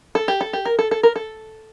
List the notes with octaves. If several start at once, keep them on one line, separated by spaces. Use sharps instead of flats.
A4
G4
A4
G4
A#4
A4
A4
A#4
A4